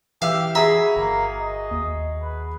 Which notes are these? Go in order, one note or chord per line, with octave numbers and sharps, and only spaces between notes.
E3 G4 E5 F5 E6
E4 F#4 G#4 E5 A#5
G1 A#3
D#5
D#2
B4